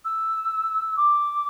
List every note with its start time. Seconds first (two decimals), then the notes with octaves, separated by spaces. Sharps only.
0.05 E6
0.97 D6